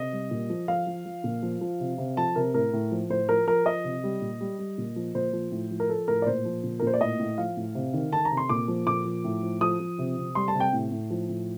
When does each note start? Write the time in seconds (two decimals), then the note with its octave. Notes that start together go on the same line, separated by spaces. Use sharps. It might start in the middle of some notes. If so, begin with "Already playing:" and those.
Already playing: C3 D#5
0.12 G3
0.31 A#2
0.50 F3
0.68 F3 F5
0.87 F3
1.06 F3
1.24 A#2
1.43 F3
1.61 F3
1.80 C3
1.98 C3
2.17 F3 A5
2.36 C3 A#4
2.54 A2 A#4
2.73 A2
2.91 F3
3.10 A2 C5
3.29 F3 A#4
3.47 F3 A#4
3.66 F3 D#5
3.84 C3
4.04 G3
4.21 A#2
4.41 G3
4.58 G3
4.78 A#2
4.96 F3
5.15 A#2 C5
5.33 F3
5.52 A2
5.71 F3
5.80 A#4
5.89 F3 A4
6.08 A2 A#4
6.22 D5
6.26 A#2 C5
6.45 F3
6.64 A#2
6.79 A#4
6.82 A#2 C5
6.94 D5
7.01 A2 D#5
7.19 A2
7.38 F3 F5
7.57 A2
7.75 C3
7.94 D#3
8.12 D#3 A5
8.25 A#5
8.31 C3
8.37 C6
8.49 A#2 D6
8.68 F3
8.87 A#2 D6
9.05 F3
9.24 A2
9.43 F3
9.61 F3 D#6
9.80 F3
9.99 C3
10.17 C3
10.35 G3 C6
10.48 A5
10.54 C3
10.60 G5
10.73 A2
10.92 A2
11.10 F3
11.29 A2